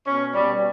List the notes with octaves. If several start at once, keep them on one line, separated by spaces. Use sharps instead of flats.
B2 C#4
B2 G3